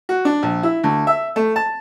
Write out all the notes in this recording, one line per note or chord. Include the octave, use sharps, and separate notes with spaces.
F#4
D4
A#1
E4
D2
E5
A3
A5